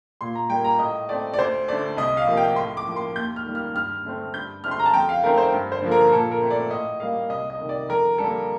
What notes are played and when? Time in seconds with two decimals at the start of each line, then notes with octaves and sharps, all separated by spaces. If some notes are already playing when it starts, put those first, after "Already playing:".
0.21 A#2 C6
0.35 A#5
0.50 G3 A#3 G5
0.64 A#5
0.79 A2 D#5
1.09 A3 C4 D5
1.34 D5
1.38 D2 C5
1.68 D3 A3 D5
1.97 C2 D#5
2.17 F5
2.27 C3 F3 A#3
2.37 G5
2.56 A2 C6
2.77 D6
2.86 F3
2.91 A#3 C6
3.16 D#2 G6
3.36 F6
3.45 D#3 G3 A#3
3.55 F6
3.75 G2 F6
4.05 D3 A3 C4
4.34 G2 G6
4.64 D3 A3 C4 F6
4.71 C6
4.79 A#5
4.86 A5
4.93 F2 G5
5.09 F5
5.23 D#3 A3 C4 A#4
5.38 C5
5.53 G2
5.72 C5
5.82 D3 F3 A#3
5.91 A#4
6.12 A#2 A4
6.31 A#4
6.42 A3 C4
6.51 D5
6.70 A2 D#5
7.00 G3 A#3 F5
7.29 C2 D#5
7.50 D#5
7.59 C3 D#3
7.69 D5
7.89 F2 A#4
8.18 D3 G3 A#3 A4